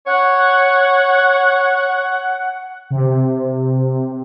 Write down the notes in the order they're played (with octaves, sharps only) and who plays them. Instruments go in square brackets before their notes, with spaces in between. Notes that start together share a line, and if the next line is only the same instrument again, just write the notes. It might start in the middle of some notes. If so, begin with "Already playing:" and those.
[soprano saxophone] C#5 [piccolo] F#5
[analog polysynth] C3